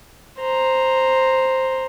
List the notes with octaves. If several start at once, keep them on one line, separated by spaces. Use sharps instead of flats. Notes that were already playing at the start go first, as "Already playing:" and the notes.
C5 A#5